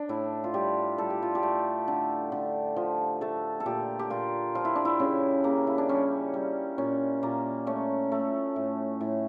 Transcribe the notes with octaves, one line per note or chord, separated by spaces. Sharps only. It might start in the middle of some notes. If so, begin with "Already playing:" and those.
Already playing: D4
A2 E4
F4
G3 G4
G3 A4
G4
F4
G4
A3
D3
D3
F3
A3 A4
A4
A#2 G4
G4
A#2 F4
F3 F4
E4
D4
E4
C#3 C#4
C#3 A#3
E4
D4
G3 C#4
G3
A#2 C#4
A#2 A#3
A3 C#4
A3
A2
A2